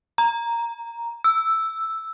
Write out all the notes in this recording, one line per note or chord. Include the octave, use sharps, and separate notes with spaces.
A#5
E6